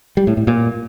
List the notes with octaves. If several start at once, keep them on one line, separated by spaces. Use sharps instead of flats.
G3
A2
A2
A#2